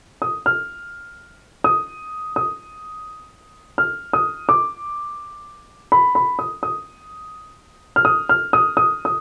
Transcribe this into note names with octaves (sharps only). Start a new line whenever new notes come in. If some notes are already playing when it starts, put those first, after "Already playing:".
D#6
F6
D#6
D#6
F6
D#6
D6
B5
B5
D#6
D#6
F6
D#6
F6
D#6
D#6
D#6